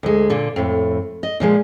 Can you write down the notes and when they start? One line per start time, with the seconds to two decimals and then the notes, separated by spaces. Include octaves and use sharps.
0.03 D2 G#3
0.30 A#2 D3
0.56 F2 A2
1.23 D#5
1.40 A#2 F3 G#3